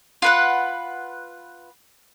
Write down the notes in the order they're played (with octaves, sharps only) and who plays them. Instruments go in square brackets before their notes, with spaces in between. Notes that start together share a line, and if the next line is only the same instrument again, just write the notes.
[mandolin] F4 B4 F#5